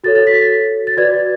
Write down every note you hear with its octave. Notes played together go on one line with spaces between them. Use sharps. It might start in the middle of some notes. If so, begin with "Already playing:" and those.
F#4 A4 C#5 A6
A6
B6
A6
F#4 B4 D5 G#6